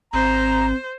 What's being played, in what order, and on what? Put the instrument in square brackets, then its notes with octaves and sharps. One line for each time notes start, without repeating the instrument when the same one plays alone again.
[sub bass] G#1 [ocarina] C4 [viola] C5 [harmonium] A#5